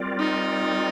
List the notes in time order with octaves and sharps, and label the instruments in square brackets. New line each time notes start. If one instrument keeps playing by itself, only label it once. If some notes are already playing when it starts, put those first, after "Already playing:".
Already playing: [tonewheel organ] G3 C4 F4 A#4 D5
[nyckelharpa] D#4